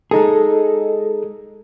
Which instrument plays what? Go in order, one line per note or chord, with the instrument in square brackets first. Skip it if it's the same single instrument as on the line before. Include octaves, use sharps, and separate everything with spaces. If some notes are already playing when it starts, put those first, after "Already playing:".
[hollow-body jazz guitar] G#3 D#4 G#4 [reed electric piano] A4